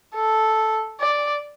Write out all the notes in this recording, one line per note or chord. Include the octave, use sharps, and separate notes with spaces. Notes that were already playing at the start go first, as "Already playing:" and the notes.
A4
D5